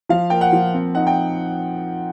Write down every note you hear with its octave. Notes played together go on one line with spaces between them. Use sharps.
F3 F5
A#3 G5
F#5
F3
C4
D#4 F#5
G5